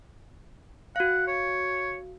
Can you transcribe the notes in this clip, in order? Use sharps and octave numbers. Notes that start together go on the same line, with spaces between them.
F#4 F5 F#5
C#5